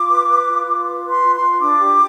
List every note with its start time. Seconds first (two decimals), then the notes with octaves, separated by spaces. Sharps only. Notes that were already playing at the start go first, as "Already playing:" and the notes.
Already playing: F4 D6
0.09 B4
0.29 B4
0.47 F4
0.66 F4
0.85 B4
1.04 B4
1.10 C6
1.23 F4
1.35 C6
1.41 F4
1.60 D4 D6
1.79 G4